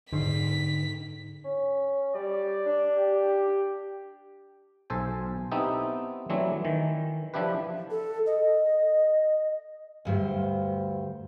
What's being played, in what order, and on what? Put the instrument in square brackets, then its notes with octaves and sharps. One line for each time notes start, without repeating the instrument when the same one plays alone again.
[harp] G#2 D6 C7 [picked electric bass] D3 [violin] B6
[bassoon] C#4
[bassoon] G3 [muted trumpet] D5
[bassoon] D4
[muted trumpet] G4
[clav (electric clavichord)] B1 A4 C5 G#5
B3 C4 D#4 E4 G4 A4
E3 F#3 A3 C4 D4 E4
D#3 E3
F3 D4 E4 G4 B4
[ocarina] A4
D#5
[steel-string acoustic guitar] D2 G2 C5